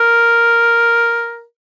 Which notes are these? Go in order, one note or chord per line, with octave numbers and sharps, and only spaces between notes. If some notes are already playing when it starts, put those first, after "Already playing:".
Already playing: A#4